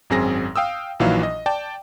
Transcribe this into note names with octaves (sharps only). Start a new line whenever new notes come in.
G#1 F#2 C4 G#4 A#6
F5 G5 D#6 E6
A#1 A#2 E3 F#3 D#4 F5
D#5
D5 G5 A5